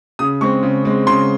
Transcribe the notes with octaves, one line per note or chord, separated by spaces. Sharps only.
C#3 D#6
G#3 C4 C#6
C#3
G#3 C4
C#3 C6